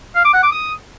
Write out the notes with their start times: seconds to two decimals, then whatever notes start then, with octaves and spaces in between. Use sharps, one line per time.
0.15 F5
0.24 D6
0.33 F#5
0.43 D6
0.52 D#6